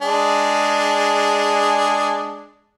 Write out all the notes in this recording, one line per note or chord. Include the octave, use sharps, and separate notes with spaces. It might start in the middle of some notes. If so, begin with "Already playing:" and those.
G#3 D4 G#4